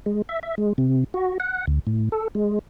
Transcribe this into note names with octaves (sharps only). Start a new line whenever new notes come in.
G#3
E5
E5
G#3
C3
F#4
F#5
D2
A2
A4
G#3